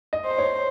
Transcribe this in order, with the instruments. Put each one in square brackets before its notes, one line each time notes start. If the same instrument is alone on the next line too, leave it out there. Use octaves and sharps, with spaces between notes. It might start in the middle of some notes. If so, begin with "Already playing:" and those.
[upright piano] D#5
[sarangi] C5
[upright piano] C#5